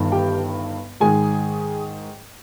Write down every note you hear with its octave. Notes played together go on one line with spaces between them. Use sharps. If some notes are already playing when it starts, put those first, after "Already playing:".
Already playing: G1 G2 D#3
G4 G5
G#2 D#3 G#3 G#4 G#5